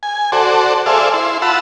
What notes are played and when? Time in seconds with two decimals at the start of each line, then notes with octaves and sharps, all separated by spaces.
0.03 G#5
0.32 F#4 A4 C5 D5
0.86 G#4 A4 C5 D5 E5 F5
1.14 E4 C6
1.42 F4 F#5 A5 B5 E6